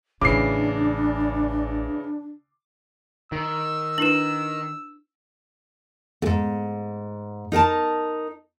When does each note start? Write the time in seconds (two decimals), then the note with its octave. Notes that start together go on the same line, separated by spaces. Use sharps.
0.21 A1 C#3 E3 D4 D6 C7
3.32 D#3 E6
3.98 D4 E4 B4 E7 F#7
6.22 E2 G#2
7.52 D#4 A#4 G5 A5